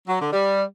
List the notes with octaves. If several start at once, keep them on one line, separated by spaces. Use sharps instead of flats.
F#3
D3
G3